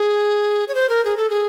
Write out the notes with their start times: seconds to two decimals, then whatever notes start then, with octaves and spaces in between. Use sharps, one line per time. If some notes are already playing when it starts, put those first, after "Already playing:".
Already playing: G#4
0.68 C#5
0.75 C5
0.89 A#4
1.05 G#4
1.17 A4
1.30 G#4